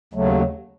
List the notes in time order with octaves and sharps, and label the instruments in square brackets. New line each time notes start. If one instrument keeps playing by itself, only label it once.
[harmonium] D#2 C#3 F#3 A3